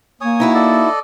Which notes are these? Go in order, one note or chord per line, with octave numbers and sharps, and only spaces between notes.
A#3 C#5 G#5 D#6
D#4 E4 F#4
A4 D5 D#5